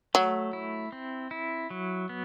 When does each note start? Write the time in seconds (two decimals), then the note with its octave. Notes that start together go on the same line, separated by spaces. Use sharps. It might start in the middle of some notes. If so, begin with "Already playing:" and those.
0.14 F#3 A3
0.53 E4
0.92 C4
1.31 E4
1.70 F#3
2.09 B3